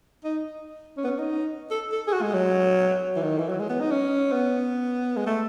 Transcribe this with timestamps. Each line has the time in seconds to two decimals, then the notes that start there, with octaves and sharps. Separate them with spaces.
0.24 D#4
0.97 C#4
1.04 B3
1.07 C#4
1.19 D#4
1.71 A4
1.92 A4
2.08 G#4
2.13 F#4
2.23 G#3
2.34 F#3
3.16 E3
3.23 D#3
3.38 E3
3.49 F#3
3.59 G#3
3.70 B3
3.80 D#4
3.91 C#4
4.32 B3
5.17 G#3
5.26 A3